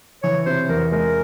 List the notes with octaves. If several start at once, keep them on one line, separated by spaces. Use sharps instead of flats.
E3 C#5
C3 C5
E2 A#4
G#3 A#4